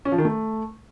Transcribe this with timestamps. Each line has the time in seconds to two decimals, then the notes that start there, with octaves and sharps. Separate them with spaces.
0.05 C#4
0.12 F3
0.18 D#3
0.25 A3